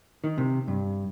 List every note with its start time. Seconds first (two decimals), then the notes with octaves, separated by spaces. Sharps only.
0.24 D#3
0.38 C3
0.68 G2